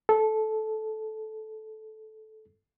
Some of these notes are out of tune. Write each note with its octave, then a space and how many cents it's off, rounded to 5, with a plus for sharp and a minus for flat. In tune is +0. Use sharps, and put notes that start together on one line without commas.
A4 -15